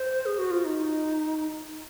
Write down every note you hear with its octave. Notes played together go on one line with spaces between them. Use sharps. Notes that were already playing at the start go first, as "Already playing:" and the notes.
Already playing: C5
G#4
F#4
F4
D#4